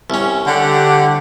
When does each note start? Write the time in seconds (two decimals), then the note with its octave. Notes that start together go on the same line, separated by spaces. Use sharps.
0.10 C2 C#4
0.47 D3 G4 F#5